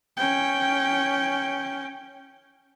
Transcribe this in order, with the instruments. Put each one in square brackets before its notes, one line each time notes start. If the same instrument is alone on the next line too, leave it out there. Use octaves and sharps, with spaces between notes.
[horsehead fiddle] C#4 G5